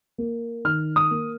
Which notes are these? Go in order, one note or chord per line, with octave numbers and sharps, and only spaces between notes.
A#3
D#3 F6
D#6
A#3